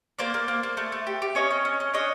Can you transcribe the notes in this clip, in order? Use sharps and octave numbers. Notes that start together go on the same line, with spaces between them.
A#3 C5 D5
A#3
A#3
A#3
A3
A3
G4
G4
C#4 C#5 D#5
C#4
C#4
C#4
D4 C#5 D#5